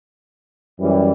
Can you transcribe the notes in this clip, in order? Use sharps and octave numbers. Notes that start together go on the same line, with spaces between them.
F#2 E3 G3